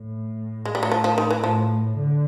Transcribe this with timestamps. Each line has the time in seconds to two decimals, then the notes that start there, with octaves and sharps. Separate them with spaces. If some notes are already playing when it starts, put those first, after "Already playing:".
Already playing: A2
0.65 G#3
0.75 G3
0.83 F#3
0.92 F3
1.04 F3
1.18 D#3
1.31 E3
1.43 A2 F3
1.96 D3